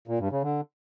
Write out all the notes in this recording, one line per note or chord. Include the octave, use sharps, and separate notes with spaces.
A#2
G2
C#3
D3